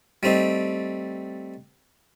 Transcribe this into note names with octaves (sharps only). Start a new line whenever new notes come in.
G3 A3 C4 D#4